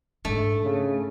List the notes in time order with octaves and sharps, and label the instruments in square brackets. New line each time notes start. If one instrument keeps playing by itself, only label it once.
[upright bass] G#2 D4 [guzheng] A3
[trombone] C#3